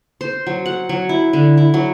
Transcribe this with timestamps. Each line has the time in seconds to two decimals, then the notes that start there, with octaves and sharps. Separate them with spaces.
0.21 C5
0.47 F#3
0.66 F#5
0.89 F#3
1.09 E4
1.33 D3
1.57 E4
1.74 F#3